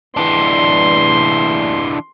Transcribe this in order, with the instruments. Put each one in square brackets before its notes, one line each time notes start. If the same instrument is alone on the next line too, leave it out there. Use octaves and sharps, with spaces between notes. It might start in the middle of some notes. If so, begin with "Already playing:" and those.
[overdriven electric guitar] E3 D4 [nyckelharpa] C6